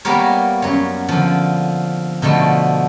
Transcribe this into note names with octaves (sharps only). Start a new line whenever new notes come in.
G3 A#3 B3 G4 A#4 C#5
F#2 C#5
D3 F3
B2 D3 F3 A3